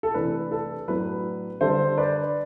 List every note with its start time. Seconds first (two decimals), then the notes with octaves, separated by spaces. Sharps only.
0.03 A4
0.14 C3 E3 A3 D4 B4
0.52 A4
0.88 A2 F#3 B3 D4 B4
1.61 D3 G3 D4 A4 C5
1.98 B4 D5